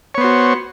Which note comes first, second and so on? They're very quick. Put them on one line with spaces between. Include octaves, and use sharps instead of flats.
C#5 B3 C5 F#4